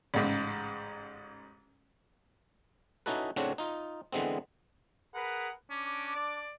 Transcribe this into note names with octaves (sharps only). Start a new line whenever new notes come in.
A1 G#2 C#3
C#4 D#4 E4 F#4 A4 B4
A2 C#3 F#3 C4 D4 F#4
D#4 F4
D3 E3 G#3 B3 C4
G#4 A#4 B4 F#5
C#4 D4 A5 D6
D5